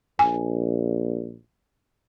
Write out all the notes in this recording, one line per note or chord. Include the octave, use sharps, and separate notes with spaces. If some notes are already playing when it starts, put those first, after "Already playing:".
A#1 G#5